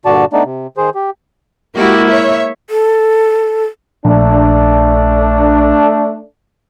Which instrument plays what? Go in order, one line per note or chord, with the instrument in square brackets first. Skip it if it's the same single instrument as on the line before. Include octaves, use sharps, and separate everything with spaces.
[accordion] G2 A#2 D3 F#4 D5 A5
A3 B3 D4 D#4 D5
C3
D#3 G#4 C5
G4
[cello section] G#3 F#4 G4 [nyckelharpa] A#3 E4
[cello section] C#5 E5
[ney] A4
[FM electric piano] A#1 [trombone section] A3 D4